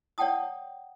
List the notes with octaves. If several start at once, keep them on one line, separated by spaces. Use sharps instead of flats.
C#5 D5 F#5 G5 A5 D#6